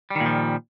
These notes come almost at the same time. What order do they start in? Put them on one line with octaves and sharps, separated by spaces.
G3 D#3 A#2 F3